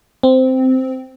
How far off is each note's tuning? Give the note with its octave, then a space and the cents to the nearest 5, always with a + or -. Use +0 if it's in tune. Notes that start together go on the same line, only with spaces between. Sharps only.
C4 -10